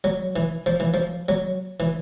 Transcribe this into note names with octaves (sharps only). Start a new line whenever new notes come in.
F#3
E3
F3
E3
F3
F#3
E3